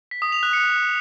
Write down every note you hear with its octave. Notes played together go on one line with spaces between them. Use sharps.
B6
D#6
F7
F#6
C#7